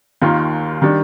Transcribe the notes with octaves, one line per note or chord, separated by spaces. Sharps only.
D#2 D#3 A#3 F4
D#3 G3 D4